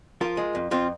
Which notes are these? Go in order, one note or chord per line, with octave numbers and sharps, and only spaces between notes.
F3 F4 A#4
G#3
F2
F2 C4 F4